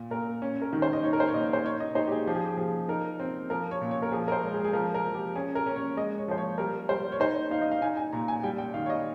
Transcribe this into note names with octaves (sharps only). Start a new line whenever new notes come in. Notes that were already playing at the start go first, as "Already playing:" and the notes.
Already playing: A#2
A#2 A#4
C#4
A#4
D#3
C5
D#5
D#4 C#5
A#4
C5
C#5
A#2 D#5
C5
D#4 C#5
D#5
D#4 C5
G4
G#4
F3 G4
G#4
G4
F3 G#4
D#4 A#4
C4
F3 A#4
C#5
A#2
C#5
A#4
F3 G#4
A#4
C5
G#3
G#4
G#4
F3 A#4
A#4
F3
G4
C#4 G#4
A#4
C#4
C#5
G#3 D#5
C#5
F3 C5
C#5
G3 A#4
G3 C5
C#5
D#4 C5
D#4 F5
D#5
F5
D#4 G#5
G#5
A#2 A#5
G#5
G3 G5
G5
D#3 F5
C#5
D#5